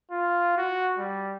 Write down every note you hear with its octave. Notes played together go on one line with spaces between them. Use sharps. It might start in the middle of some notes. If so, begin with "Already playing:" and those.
F4
F#4
G3